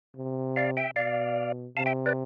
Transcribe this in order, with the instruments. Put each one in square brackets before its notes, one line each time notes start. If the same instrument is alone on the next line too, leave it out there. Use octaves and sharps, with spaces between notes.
[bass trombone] C3
[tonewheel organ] D5 F5
E5 G5
[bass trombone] B2 [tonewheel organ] D5 F5
[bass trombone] C3 [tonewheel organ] F5 A5
[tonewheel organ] E5 G5
B4 D5